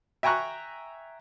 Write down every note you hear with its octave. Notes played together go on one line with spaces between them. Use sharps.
E5 G5 G#5 A#5 C#6 F#6